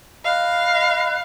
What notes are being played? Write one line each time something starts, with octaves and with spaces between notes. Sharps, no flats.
D#5 F5 B5 F#6